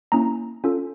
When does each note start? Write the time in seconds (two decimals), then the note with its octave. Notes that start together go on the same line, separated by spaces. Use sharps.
0.12 A#3 C#4 E4 A#5
0.64 C#4 F4 A4